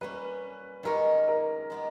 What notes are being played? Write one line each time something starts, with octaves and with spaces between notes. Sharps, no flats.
G3 A#3 C#4 B4
D#3 G#3 C#4 G4 A#4 C#5
A#4
G#3 B3 G4